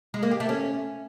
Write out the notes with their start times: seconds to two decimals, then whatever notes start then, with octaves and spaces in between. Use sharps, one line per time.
0.14 G#3
0.23 A#3
0.31 G4
0.40 A3
0.49 C#4